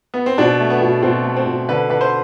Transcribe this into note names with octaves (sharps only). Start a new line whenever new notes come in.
B3
C4
B2 D4
A3
B3
B2
B2 C4
A3
C4
B2
D3 B4
D3 B4
C5